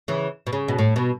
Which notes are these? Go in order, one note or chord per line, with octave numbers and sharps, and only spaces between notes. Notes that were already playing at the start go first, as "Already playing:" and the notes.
C#3 E3
B2
C#3
B2
A2
B2